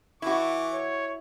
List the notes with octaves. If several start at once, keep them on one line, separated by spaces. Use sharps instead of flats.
E3 E4 F#4 C#6 D6
C#5